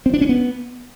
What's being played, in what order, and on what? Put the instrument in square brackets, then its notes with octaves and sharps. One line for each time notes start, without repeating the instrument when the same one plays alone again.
[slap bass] C4
D4
C#4
B3